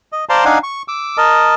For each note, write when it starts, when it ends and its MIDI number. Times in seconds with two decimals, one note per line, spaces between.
0.12 0.25 75
0.29 0.45 72
0.29 0.45 74
0.29 0.45 77
0.29 0.45 81
0.29 0.45 82
0.29 0.45 84
0.45 0.59 62
0.45 0.59 63
0.45 0.59 77
0.45 0.59 78
0.45 0.59 80
0.63 0.82 85
0.88 1.17 86
0.88 1.17 88
1.17 1.55 70
1.17 1.55 75
1.17 1.55 81